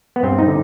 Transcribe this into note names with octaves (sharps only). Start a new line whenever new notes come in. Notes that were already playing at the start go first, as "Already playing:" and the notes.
B3
G2 C4
D#4
D3